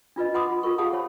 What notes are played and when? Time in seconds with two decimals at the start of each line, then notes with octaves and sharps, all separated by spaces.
0.16 D4 F4 B4 D#5
0.34 B4 F#5 B5 C6 D6 D#6
0.50 F4
0.63 F4 A4 A#4 C#6
0.78 G4 G#4 F5 F#5 A5 D#6
0.93 C5 C#5 A5 B5